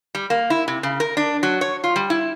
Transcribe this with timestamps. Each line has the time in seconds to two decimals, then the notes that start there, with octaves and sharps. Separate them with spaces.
0.15 G3
0.30 A#3
0.50 E4
0.68 C3
0.83 C#3
1.00 A#4
1.17 D4
1.43 F#3
1.61 C#5
1.84 F4
1.96 G3
2.10 E4